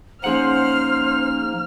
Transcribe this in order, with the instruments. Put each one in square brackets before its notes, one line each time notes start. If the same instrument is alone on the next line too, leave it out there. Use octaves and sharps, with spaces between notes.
[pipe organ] F3 A#3 D#4 [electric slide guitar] C#4 G#4 F#5 [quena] C5 [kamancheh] F6